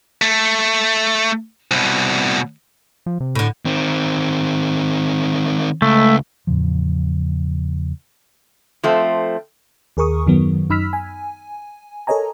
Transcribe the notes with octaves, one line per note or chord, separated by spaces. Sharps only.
A3
C2 B2
F3
C3
A2 D3
D#3 C4
C#2 A3
E2 A2 C#3 F3
F3 A3 C4
D#2 G#4 A#4 C#6 D#6
F#2 D#3 F#3 B3
F#2 D#4 B5 E6 F6 B6
G#5
A4 A#4 C#5 D#5 G#5 A#5